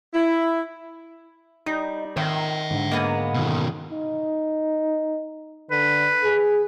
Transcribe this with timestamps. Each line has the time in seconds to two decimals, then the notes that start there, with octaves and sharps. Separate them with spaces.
0.14 E4
1.66 G3 D#4
2.17 D#3 C4 C#5 E5
2.70 G#2 D3
2.91 G#3 A#3 B3
3.34 B2 D#3
3.92 D#4
5.71 D3 B4
6.24 G#4